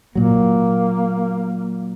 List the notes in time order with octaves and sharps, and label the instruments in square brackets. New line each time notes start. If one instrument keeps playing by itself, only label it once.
[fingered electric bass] A#2 F#3 [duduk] A#3